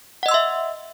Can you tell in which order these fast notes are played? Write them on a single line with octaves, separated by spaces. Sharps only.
F#5 D#5 E6 C6 E5